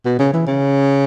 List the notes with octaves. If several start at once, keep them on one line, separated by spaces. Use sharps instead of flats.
B2
C#3
E3
C#3